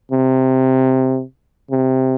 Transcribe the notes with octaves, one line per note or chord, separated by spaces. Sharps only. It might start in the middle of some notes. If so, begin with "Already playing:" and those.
C3
C3